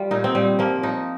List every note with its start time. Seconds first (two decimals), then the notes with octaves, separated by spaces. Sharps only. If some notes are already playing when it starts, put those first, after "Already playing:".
Already playing: G3 F4
0.11 A#2 D#4
0.24 C4
0.35 A#2 G3
0.59 F3 A#3
0.83 F3 D#4